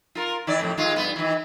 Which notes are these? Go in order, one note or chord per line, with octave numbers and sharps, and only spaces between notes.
F4 A#4
D#3 E3 D5
F2 A2 C3
D#3 G#3 F4
G2 B3
D#3 E3